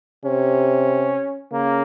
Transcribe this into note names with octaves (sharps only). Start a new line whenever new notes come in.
C3 C#4
C#3 A#3